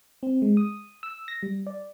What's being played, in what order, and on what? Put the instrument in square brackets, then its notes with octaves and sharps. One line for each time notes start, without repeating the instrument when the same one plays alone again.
[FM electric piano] C4
G#3
D#6
E6
A#6
G3
D5